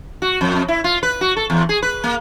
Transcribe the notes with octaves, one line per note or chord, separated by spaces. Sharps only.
F#4
F2
E4
F4
B4
F#4
A4
E2
G#4
B4
A#3